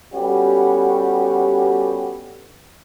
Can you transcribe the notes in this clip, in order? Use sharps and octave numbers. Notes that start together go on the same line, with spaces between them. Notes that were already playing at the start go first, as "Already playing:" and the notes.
G3 B3 C#4 F#4 G4 A4